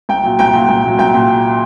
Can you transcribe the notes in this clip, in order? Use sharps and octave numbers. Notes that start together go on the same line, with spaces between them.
C2 G5
A#2 F#3
C2 G5
A#2 F#3
C2
A#2 F#3
C2 G5
A#2